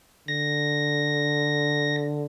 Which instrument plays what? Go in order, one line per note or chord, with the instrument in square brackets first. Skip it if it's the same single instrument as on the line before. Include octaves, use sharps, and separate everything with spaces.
[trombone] D3 [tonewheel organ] A#6